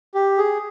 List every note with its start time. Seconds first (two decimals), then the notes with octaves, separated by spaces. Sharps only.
0.15 G4
0.38 G#4